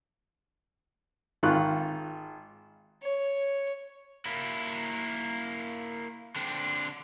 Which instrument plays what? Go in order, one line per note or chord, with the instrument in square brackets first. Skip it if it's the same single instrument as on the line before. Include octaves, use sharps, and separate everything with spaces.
[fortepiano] G#1 D#3 F4 C#6 F#6
[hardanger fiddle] C#5
[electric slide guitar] A#3 E4
D3 C4 D4